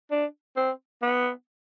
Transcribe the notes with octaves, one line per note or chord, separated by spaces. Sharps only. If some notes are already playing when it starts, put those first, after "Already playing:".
D4
C4
B3